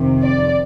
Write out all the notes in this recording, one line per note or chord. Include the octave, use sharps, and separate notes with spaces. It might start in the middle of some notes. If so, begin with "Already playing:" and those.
Already playing: F2 C3 D#3
D5